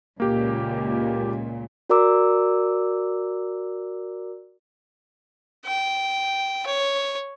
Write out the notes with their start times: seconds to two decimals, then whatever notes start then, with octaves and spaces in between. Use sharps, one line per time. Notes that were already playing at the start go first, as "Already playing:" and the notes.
0.20 C#2 A#2 A#3 G4
1.90 F#4 A#4 D5 A#5 D6 E6
5.65 G5
6.66 C#5